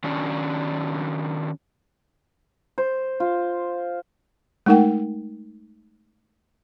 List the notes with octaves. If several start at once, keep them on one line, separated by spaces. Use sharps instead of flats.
D#3 F#3 C#4 D4
C5
F4
G#3 A3 D#4 A#4 F#5 G5